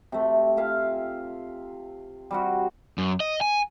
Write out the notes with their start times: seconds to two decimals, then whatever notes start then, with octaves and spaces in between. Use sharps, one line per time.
0.12 C3 A3
0.57 F4 E5 F5 G#5
2.31 G3 C4 F#4
2.98 F#2
3.20 D#5
3.41 G#5